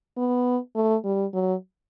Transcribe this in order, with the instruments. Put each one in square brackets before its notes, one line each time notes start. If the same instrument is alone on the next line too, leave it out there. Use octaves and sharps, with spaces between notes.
[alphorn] B3
A3
G3
F#3